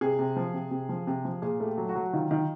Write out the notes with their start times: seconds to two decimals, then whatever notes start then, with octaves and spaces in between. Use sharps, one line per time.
0.01 C3 G#4
0.19 C3
0.36 F3
0.54 C3
0.71 C3
0.89 F3
1.07 C3
1.25 F3
1.42 A#2 G#4
1.60 A3
1.66 G4
1.78 F#3
1.89 F#4
1.95 F#3
2.13 D#3 F4
2.31 D#3